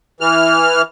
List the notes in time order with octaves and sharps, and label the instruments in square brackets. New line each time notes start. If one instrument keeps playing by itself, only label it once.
[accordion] E3 F6